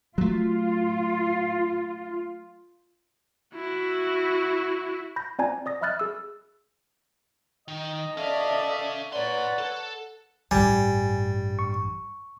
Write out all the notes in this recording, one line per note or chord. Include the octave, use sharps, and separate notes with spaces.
F#3 A3 F4
E4 F#4
B5 G6 A#6
C4 F4 D5 G#5 A#5 G#6
D5 D#6 A#6
D#5 E5 B5 F6 F#6 A6
G#4 E6
D#3 D#5
C#4 A4 D5 E5 F5
B4 C#5 D5 F#5 A#5 C6
A4
A1 G2 G3 G#5
C#6